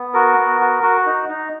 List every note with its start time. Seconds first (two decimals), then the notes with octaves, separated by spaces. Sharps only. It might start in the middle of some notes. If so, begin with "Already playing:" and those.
Already playing: B3
0.14 F#4 A#4
0.38 B3
0.61 F#4
0.83 F#4
1.06 D#4
1.29 D#4